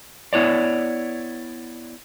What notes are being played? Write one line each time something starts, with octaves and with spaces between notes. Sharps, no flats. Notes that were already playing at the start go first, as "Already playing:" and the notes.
B3 E4 C#5 D5